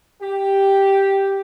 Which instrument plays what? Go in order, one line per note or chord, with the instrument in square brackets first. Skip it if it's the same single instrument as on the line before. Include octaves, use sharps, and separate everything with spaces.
[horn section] G4